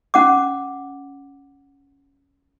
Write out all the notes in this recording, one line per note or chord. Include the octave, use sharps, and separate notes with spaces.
C#4 F#5 D6